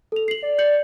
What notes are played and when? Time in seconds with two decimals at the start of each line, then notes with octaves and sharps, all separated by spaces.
0.12 A4 F7
0.28 C7 F#7
0.42 D5
0.58 G6 C#7 F#7